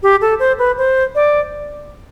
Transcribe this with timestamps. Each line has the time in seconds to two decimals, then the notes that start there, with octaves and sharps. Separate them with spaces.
0.03 G4
0.21 A4
0.39 C5
0.59 B4
0.78 C5
1.15 D5